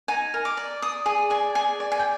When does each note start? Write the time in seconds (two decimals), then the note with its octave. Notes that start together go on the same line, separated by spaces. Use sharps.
0.08 D#4 G#5
0.34 A#4
0.45 D6
0.57 D5
0.82 D5 D#6
1.06 G#4 D#6
1.30 D5 G#5
1.55 G#4 G#5
1.80 D5
1.92 G#5
1.99 G5